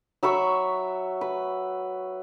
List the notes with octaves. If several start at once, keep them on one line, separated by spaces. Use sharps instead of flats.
F#3 E5 B5 C#6
B4